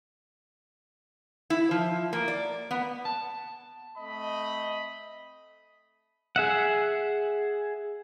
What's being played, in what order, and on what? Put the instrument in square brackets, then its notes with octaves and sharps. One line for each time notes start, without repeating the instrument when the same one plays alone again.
[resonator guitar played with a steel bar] E4
F3
A#3
D5
B3
[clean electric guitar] A5
[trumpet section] A3 C4 D#5 B5
[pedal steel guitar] G#4 E5 F#5